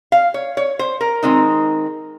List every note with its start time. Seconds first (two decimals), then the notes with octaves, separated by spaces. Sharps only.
0.12 F5
0.34 C#5
0.57 C#5
0.79 C5
1.01 A#4
1.23 D#3 G#3 C4 D#4